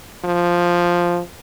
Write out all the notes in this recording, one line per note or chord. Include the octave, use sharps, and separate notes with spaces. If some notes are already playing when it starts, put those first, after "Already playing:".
F3